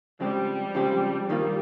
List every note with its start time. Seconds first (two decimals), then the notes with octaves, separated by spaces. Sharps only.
0.20 C#3 F3 G3 G#3 C4 G4
0.75 C#3 F3 G#3 C4 G4
1.29 G2 D#3 G3 A#3 F4